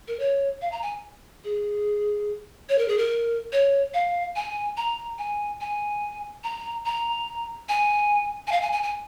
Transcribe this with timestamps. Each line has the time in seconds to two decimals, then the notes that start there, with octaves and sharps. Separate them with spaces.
0.08 A#4
0.19 C#5
0.62 F5
0.72 A#5
0.82 G#5
1.44 G#4
2.69 C#5
2.78 A#4
2.88 G#4
2.98 A#4
3.53 C#5
3.94 F5
4.36 G#5
4.77 A#5
5.19 G#5
5.61 G#5
6.44 A#5
6.86 A#5
7.69 G#5
8.47 G#5
8.52 F5
8.62 G#5
8.72 G#5
8.83 G#5